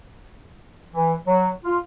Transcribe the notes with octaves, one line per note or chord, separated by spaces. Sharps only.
E3
F#3
F4